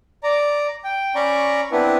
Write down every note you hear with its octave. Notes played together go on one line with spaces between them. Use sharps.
D5 A#5
G5
C#4 D5 A#5 B5 C#6
B3 C4 D4 E4 B4